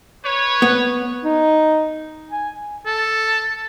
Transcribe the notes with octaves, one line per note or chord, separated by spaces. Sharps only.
B4 C#5
B3
D#4
G#5
A4